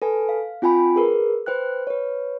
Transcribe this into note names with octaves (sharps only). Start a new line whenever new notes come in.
A4 B4 G#5
F5
C4 F4 G5 G#5 B5
G#4 A#4 B4
B4 C5 G5 F#6
B4 C#5